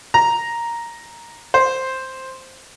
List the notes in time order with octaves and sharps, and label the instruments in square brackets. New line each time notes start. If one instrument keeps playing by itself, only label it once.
[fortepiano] A#5
C5